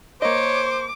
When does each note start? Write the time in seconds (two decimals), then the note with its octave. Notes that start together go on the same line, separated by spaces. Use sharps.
0.22 A#3 C5 C#5 D#5 D6